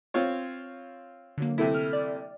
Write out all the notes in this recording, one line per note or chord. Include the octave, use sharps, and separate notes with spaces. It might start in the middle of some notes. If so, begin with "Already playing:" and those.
C4 F4 C#5
D3 F#3 A#3
C3 A3 E4
F6
D5